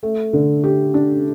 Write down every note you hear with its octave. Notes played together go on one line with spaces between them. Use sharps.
A3
D3
G4
D4